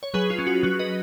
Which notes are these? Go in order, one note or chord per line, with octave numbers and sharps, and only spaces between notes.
C#5
F#3 G#4 B4
F4
C#4
F#4
F#3 F#4
B4 D#5